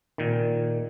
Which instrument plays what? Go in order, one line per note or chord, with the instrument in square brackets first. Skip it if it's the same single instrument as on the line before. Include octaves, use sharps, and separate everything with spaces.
[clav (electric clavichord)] A#2 D#3